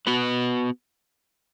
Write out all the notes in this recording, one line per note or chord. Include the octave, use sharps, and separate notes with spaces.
B3 F#4 B4